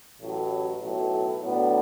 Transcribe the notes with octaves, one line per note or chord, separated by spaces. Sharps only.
A1 A2 F#3
B1 A2 F#3
A2 F#3 B3 D4